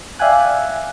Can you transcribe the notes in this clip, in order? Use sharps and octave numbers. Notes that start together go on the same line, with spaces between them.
D5 E5 F5 G5 G#5 F#6